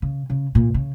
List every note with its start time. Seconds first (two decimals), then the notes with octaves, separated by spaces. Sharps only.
0.02 C#3
0.30 C#3
0.55 A#2
0.74 C#3